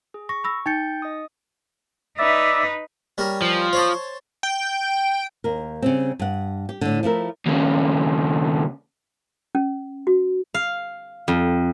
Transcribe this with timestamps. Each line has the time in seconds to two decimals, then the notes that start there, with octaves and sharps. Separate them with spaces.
0.14 G#4
0.29 C#6 A#6
0.44 B5 E6 A#6
0.66 D#4 G5 G6 A6 C#7
1.02 D#5 D#6
2.18 D#4 B4 D5 E5
3.18 G3 C#4 A#4
3.42 F3
3.73 C5 C#5 A5
4.43 G5
5.44 D#2 A#4
5.82 C#3 G3 C4
6.19 G2 F#5
6.69 G4
6.81 A2 D3
7.03 F3 A3 E4 A#4
7.46 D#2 C#3
9.55 C#4
10.07 F#4
10.54 F5
11.28 F2